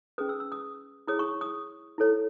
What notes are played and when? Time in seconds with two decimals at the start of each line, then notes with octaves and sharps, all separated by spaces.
0.18 C#4 G#4 B4 D#6
0.29 E6
0.40 E6
0.52 D#6
1.07 E4 G#4 C#5 D#6
1.19 C#6
1.41 D#6
1.98 E4 A4 C#5